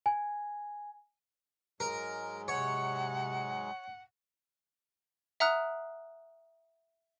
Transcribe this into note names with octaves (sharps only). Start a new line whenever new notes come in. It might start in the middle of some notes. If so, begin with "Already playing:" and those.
G#5
G#2 F#3 G#3 A#4
C3 C#5 F#5
E5 F#5 A#5 D#6 F6 F#6